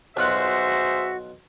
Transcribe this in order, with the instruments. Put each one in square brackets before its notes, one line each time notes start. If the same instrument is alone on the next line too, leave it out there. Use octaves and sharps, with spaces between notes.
[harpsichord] B1 F4 F#5 [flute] F#4 [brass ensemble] G#4 C5 E5